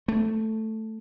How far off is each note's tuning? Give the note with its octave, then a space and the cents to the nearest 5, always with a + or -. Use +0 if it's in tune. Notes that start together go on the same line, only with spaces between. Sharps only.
A3 +0